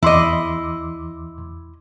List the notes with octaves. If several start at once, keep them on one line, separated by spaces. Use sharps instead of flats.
E2 E4 D#5 C6 D6